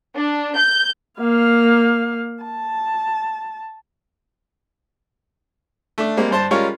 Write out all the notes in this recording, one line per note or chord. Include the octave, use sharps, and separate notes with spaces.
D4
G6
A#3 F5
A5
A3 D4
G3 G#3 A#3 C4
G2 C5 A5
G3 G#3 C#4 F4 A#4 C#6